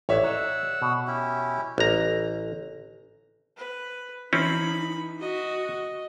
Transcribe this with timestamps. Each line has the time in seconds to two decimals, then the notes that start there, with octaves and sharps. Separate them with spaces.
0.09 A1 C#5 D5 E5
0.24 D#5 F#5 A#5 E6
0.82 B2
1.07 C#4 E4 G4
1.78 A1 A#5
3.57 B4
4.33 E3 C4 C#4 D#4 B5
5.20 F#4 D#5